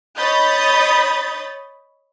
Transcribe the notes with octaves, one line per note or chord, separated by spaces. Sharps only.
C#5 D#5 B5 D#6 G6 A6